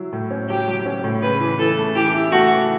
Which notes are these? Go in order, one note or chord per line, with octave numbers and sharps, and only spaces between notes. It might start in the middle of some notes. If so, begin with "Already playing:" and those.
Already playing: F#3 E4
A2
C#4
F#3 G4
F#3
C#4
A2
C#3 B4
E3
E3 A4
A3
E3 G4
E4
A3 F#4
E3